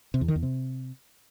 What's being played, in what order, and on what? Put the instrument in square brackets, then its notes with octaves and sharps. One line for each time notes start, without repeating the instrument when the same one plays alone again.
[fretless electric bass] C3
E2
D#3
E2
C3